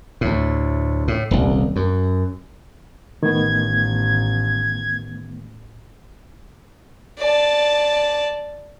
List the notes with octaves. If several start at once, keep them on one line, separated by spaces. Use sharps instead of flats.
D2 A2
A2
D#1 C2
F#2
A1 D#3 A3 B3 G#6
D5 A5